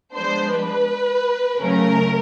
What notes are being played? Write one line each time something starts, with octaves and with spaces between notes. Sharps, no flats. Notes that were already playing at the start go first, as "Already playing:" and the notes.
F3 G#3 B3 D4 C5
B4
C#3 F#3 A3 C#4 A#4